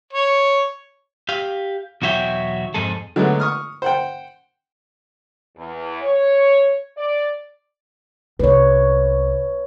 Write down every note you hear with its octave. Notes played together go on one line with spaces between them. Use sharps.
C#5
G4 F5
B1 E2 F#4 C#5 E5 G5
F2 G#2 G#4 A4
D3 F#3 G#3 A3 B3
C#6 D#6 F6
C5 F#5 G5
E2
C#5
D5
C2 F4 B4 C#5